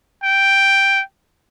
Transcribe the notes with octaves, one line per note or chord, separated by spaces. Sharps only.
G5